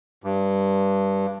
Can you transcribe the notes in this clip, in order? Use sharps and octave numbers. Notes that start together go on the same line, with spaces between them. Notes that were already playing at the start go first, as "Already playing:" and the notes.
G2